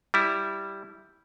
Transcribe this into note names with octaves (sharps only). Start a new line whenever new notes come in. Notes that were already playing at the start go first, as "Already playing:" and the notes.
G3 E4